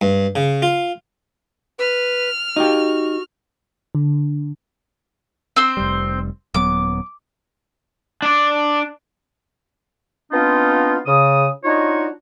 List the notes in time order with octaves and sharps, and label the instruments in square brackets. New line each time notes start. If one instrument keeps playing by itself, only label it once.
[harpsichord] G2
C#3
F4
[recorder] B4 [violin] F6
[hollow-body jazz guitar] D#4 G4 [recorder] F#4
[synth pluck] D3
[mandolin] C4 C5
[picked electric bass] F1 G3
[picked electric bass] D#1 F#3 B3 [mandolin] D6
[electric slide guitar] D4 D5
[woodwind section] B3 C4 D4 D#4 F4
C#3 D#6
D4 D#4 F4 F#4 C#5 D#5